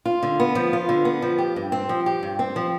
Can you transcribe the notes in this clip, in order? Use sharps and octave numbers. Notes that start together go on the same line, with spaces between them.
F4
D3
B3
F3
F4
D3
B3
F3
G4
G2
C4
F3
G4
G2
C4
F3